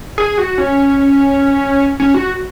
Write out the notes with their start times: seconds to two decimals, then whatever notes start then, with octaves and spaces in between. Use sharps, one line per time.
0.18 G#4
0.38 F#4
0.58 C#4
2.00 C#4
2.14 F#4